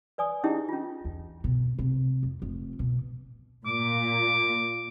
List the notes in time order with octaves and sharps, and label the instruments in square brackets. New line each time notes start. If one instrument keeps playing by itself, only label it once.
[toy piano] B4 D5 G#5 D#6
C#4 D#4 E4 G4 G#4 D#5
C#4 F4
[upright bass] E2
B2
C3
F2
F1
B2
[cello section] A#2 [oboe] D6